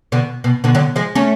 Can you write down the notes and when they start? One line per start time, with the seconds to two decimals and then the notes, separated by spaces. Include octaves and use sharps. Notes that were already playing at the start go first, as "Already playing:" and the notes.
0.12 B2 D3
0.44 B2
0.64 B2 D3
0.75 D3 F#3
0.96 F3 G#3
1.15 A3 C#4